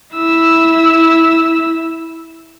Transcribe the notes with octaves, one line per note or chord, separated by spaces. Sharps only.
E4 E6